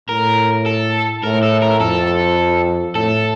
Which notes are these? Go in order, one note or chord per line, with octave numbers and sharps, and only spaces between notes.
A2 A#4
A4
A2 A#4
A4
A#4
F2 A4
A2 A4